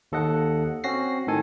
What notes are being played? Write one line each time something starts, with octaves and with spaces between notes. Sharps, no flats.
D#2 A4 D#5 F#5
C4 C#4 F#4 A#6 C7
A2 D#3 A4 G#5